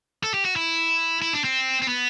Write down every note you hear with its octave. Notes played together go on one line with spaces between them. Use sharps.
A4
G4
F#4
E4
E4
D4
C4
C4
B3